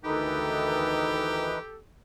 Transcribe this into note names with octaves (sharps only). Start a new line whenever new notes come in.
D2 D#3 E3 D#4 G4 A4 B4 D#5